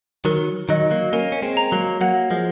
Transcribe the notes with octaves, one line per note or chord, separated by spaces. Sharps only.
D#3 F#3 A#4
D#3 F#3 D#5
F#3 A#3
A#3 C#4 A#4
C#4
G#3 C4
A#5
F#3 A#3
F#3 A#3 F#5
F3 G#3